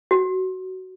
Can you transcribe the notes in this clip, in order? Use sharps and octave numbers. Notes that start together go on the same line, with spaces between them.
F#4